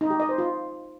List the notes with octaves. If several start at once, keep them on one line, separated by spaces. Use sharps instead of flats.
D#4
G4
D#5
C5
F4